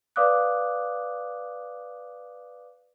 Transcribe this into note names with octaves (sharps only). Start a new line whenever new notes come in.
B4 D5 F5 D6 D#6 F#6